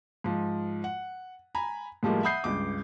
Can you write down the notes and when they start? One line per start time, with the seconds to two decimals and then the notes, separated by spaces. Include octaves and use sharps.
0.24 G#2 F3
0.84 F#5
1.55 G#5 A#5 B5
2.03 A2 F3 G3 G#3 A#3
2.23 E5 F#5 B5 D#6 G6 C7
2.44 C#2 G2 D6